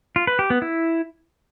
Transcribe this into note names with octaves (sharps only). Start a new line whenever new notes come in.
F4
B4
G4
B3
E4